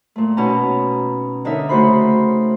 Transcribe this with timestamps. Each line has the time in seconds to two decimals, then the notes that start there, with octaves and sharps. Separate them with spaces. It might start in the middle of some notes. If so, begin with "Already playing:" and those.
0.16 A#2 A3
0.37 B2 C#4 D#4 A5 A#5
1.45 D3 D4 D#4 A#4 C#5 E5
1.69 C#3 A3 F#4 C5 B5